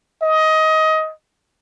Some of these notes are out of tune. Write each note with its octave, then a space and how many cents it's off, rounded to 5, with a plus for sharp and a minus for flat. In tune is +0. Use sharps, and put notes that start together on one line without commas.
D#5 +20